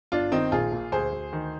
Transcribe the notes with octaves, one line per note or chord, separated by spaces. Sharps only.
G1 D4 F4
D#3 C4 D#4
A#1 F4 G#4
A#2
D2 G#4 C5
D2
D#3